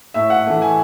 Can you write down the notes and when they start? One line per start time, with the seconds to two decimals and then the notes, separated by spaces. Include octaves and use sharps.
0.14 A2 E5
0.30 F#5
0.46 E3 A3
0.62 G#5